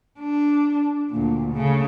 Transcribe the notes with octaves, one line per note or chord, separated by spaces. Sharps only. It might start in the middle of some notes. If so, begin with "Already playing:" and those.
D4
D2 A#2
C#3 A3